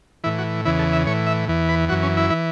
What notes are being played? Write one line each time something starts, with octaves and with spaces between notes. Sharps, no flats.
A2 E3 E4
F#4
E2 C#3 E3 E4
A4
E5
A2 E3 C#5
E5
E2 E3
B4
F#2 E3 F#4
C#4
E4
E3